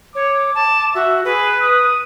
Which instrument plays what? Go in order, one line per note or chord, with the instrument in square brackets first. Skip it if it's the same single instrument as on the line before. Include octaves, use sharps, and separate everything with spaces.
[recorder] C#5 [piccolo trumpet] D6
[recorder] A5 [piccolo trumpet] D6
[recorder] F#4 [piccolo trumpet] E5
[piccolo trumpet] G#4 [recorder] B4
[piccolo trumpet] D#6